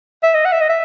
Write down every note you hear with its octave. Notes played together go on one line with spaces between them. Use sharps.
E5
D#5
F#5
E5
D#5
E5